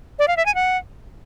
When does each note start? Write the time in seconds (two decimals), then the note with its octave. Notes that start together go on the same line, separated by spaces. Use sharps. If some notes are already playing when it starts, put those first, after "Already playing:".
0.19 D5
0.28 F5
0.37 E5
0.46 G#5
0.55 F#5